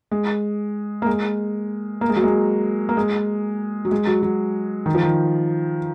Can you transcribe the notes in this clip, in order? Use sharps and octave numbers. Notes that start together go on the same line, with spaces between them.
G#3
A#3
G#3
A#3
G#3
F#3
G#3
A#3
G#3
F#3
G#3
F#3
F#3
D#3
F3
D#3